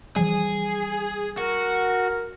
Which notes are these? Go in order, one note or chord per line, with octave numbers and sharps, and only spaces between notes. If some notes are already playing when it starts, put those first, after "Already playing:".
E3 F3 G3 G#4
F#4 A#4